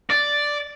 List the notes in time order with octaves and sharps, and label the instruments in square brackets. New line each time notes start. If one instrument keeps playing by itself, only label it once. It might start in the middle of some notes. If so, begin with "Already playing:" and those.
[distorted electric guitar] D5